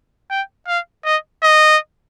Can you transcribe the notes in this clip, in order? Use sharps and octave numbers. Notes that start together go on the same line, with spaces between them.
G5
F5
D#5
D#5